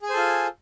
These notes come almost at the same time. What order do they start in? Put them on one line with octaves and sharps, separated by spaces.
G#4 G#5 C5 A4 F4